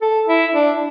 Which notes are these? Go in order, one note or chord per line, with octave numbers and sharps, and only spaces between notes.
A4
E4
D4